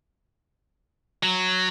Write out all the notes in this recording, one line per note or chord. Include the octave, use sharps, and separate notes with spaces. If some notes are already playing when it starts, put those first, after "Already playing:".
F#3